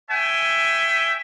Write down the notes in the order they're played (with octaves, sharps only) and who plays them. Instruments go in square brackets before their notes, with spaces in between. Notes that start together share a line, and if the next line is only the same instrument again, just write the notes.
[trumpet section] C#5 E5 G5 G#5